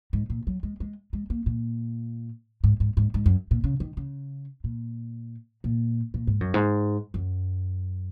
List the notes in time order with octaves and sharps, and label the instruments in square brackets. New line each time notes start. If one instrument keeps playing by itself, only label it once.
[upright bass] G#2
A#2
F#3
G#3
G#3
G#3
A#3
A#2
G#2
G#2
G#2
G#2
F#2
A#2
C#3
D#3
C#3
A#2
A#2
A#2
G#2
F#2
G#2
F#2